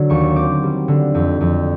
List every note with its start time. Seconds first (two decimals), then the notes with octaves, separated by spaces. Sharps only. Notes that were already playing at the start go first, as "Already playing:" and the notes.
Already playing: D3 F#3
0.10 D#2 C#6
0.36 C4 D6
0.63 G3
0.88 D3
1.14 F2
1.41 F2